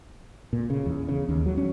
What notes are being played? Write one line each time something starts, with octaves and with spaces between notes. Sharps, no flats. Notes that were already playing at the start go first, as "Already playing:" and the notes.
A#2
C#3
E2
C#3
D#2
F#3
C#4